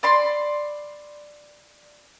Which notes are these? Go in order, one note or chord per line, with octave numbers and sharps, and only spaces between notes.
D5 B5 C6